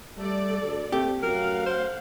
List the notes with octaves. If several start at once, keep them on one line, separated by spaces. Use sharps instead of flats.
G3 A3 A4 D5
D2
A3 A#3 C4 G4
F#2 A3 A#4 F5 F#5
C5